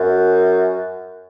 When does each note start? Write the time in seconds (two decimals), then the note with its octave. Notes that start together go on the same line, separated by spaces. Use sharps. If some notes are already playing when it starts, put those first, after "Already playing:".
Already playing: F#2